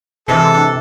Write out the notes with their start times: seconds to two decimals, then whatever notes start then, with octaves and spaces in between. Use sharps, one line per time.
0.28 C3 E3 G#3 A4 C5
0.54 D4